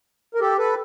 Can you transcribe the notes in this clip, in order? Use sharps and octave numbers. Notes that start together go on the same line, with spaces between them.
A#4
G4 A4
A4 B4